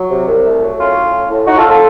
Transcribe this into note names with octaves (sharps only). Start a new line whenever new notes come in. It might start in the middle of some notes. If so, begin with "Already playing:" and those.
Already playing: F#3
C3
C2
A3
F#3
A2 C#4 F4
A2
A2
A2
A2 D#4 F#4
F4 A4
A2
F4 A4